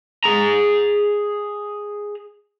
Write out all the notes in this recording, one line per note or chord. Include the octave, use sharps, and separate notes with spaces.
G#4 A#5